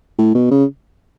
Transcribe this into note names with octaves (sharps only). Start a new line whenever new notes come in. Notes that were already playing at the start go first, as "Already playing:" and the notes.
A2
B2
C#3